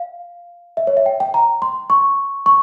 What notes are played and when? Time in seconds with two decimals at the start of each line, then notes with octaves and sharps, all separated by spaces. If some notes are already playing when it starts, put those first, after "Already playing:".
Already playing: F5
0.77 E5
0.87 C#5
0.97 E5
1.06 G5
1.20 G5
1.34 A#5
1.62 C6
1.90 C#6
2.46 C#6